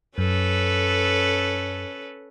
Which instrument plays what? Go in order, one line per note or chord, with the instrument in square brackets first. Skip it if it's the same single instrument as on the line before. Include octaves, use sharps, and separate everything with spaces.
[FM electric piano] F#2 [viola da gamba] C#4 A4 B4